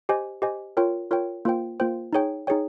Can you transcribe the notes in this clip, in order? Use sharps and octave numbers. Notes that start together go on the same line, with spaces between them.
G4 C5 D#5 G#5
G4 C5 D#5 G#5
F4 A#4 C#5 G5
F4 A#4 C#5 G5
A#3 F4 C5 G5
A#3 F4 C5 G5
D#4 G#4 C#5 G5
D#4 G#4 C#5 G5